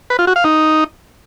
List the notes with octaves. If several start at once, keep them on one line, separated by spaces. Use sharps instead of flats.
B4
F4
F#4
F5
D#4